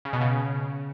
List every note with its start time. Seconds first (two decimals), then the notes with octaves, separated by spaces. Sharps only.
0.05 C#3
0.13 B2
0.21 C#3